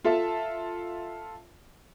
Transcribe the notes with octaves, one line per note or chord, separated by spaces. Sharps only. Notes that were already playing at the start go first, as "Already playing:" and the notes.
F4 A4 E5 A5